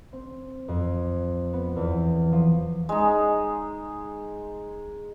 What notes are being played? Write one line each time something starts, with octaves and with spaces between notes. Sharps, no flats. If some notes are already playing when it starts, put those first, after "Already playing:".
C4
F2
B3
E2
F3
G#3 D#4